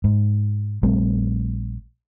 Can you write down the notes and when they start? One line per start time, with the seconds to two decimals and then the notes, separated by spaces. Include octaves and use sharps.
0.04 G#2
0.83 A#1 G3 A3 C4